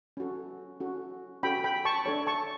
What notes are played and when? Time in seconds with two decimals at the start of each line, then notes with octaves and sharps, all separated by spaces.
0.17 C#4 F#4 A4
0.80 C#4 F#4 A4
1.43 C#4 F#4 A4 G5 B5
1.64 G5 B5
1.85 A5 C#6
2.06 D4 A4 C#5
2.27 A5 C#6